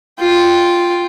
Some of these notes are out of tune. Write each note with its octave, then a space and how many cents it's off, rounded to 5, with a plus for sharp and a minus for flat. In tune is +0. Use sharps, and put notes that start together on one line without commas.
F4 +0 G5 +5